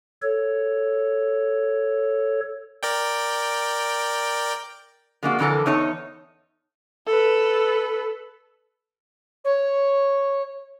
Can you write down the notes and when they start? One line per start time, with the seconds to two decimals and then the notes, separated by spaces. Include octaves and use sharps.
0.22 A4 C#5
2.83 A#4 D5 G5
5.23 F3 G#3 A#3 D4 E4 F#4
5.39 F2 D3 E3 G#3 A4 A#4
5.66 E2 D#4 C#5 A5
7.07 A4 B4
9.44 C#5